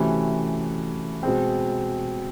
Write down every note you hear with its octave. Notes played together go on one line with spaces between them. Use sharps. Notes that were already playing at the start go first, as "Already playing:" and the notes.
Already playing: C3 E3 A3 C#4 F#4
B2 G#3 C4